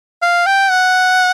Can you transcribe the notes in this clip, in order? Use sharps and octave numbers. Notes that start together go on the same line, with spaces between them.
F5
G5
F#5